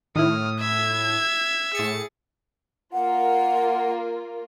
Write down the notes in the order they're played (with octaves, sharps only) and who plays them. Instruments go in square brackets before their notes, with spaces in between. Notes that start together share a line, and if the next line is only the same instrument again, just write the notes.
[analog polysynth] A2 [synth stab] D#3 E4 [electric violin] D#6 F6
[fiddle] E5 [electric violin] G#6
[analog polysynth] A2 A6 C#7 [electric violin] G#4
[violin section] A#3 F4 A#4 [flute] F#5